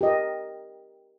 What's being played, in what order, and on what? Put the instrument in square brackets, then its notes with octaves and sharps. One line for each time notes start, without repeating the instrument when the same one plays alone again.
[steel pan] G4 A#4 D#5